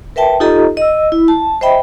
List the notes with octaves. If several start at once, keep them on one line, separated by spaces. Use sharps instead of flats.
A#4 B4 E5 G5 A5
D#4 F4 G4 A4 D#5 A#5
D#5 E6
E4
A5
C5 D#5 E5 G5 B5